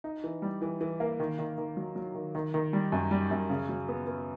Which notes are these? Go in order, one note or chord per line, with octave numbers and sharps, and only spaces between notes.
D#4
E3
G3
E3
E3
A#3
D#3
D#3
D#3
F#3
F#3
D#3
D#3
D#3
G3
F#2
G3
F#2
C#3
F#3
B3
B3